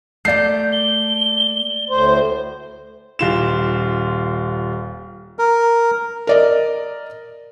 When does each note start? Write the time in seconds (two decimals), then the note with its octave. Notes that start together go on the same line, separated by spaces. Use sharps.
0.25 A3 A#3 D5 G6 C7
0.72 G7
1.90 D2 A2 C5
3.19 D#1 F4 E7
5.39 A#4
6.27 A#4 D5 D#5